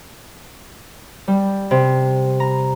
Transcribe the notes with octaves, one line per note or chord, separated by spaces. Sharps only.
G3
C3
A#5